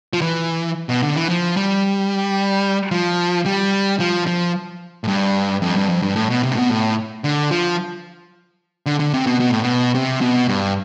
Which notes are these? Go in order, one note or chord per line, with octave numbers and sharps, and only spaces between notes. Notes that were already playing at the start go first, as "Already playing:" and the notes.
F3
E3
B2
D3
E3
F3
G3
F3
G3
F3
F3
A2
G2
F2
G2
F2
G2
A2
B2
C3
A2
B2
A2
D3
F3
D3
D3
C3
B2
B2
A2
B2
C3
B2
G2